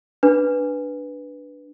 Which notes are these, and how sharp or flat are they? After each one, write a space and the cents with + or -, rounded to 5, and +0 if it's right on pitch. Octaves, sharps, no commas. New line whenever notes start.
D4 +0 B4 +0